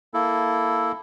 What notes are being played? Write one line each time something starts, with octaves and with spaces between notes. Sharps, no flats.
A#3 E4 A4